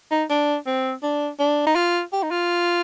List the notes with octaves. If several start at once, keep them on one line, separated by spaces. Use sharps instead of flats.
D#4
D4
C4
D4
D4
D#4
F4
G4
D#4
F4